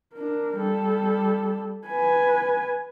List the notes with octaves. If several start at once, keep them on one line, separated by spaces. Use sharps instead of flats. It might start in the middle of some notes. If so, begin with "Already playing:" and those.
D4 A#4
G3 A4
B4 G#5